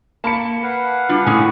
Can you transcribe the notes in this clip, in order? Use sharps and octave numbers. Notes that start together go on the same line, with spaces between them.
A#3 A5 B5 C#7
B4 F5 F#5
G3 D4 F4
A2 G#3 C#4 G#4